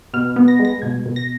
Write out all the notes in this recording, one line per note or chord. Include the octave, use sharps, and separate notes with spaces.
B2 F6
B3
A#6
G#3
A#6
B2 G#6
B2
A#6